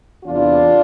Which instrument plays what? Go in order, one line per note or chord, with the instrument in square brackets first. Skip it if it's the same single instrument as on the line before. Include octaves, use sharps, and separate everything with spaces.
[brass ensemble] E2 C3 E3 D4 F4